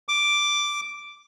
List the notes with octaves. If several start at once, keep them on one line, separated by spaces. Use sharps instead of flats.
D6